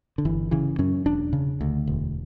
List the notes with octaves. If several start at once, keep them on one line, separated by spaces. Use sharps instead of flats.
D3
G1 E3
C#3 E3
F#2 C#4
E1 D4
C#3
D2
E1